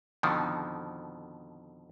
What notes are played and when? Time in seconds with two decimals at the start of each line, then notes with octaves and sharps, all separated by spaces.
0.23 F2 B2 D3 D#3 F3